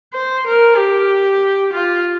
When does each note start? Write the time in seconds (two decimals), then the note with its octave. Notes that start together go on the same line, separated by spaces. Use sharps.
0.14 C5
0.47 A#4
0.78 G4
1.73 F4